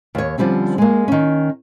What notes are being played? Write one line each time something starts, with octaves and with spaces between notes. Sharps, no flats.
D#2 C#5
D3 F3 G3 C4 C#4
G#3 A#3
D#3 C#4